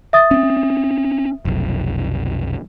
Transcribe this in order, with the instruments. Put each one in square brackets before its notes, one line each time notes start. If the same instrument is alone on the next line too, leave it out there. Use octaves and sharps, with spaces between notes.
[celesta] E5 D#6 A6
[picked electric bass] C4 C#4
F1 B1